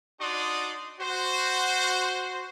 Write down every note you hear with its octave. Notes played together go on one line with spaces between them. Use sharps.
D4 D#4 F#4 D5 C6 D#6
F#4 C5